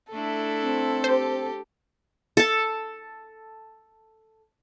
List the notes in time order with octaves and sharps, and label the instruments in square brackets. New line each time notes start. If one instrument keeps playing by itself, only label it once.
[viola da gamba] A3 D4 E4 [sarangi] A4
[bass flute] C4
[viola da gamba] G4 [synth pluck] C5
[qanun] A4 A5